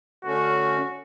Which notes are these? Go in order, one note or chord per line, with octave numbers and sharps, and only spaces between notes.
D3 A3 C#4 F#4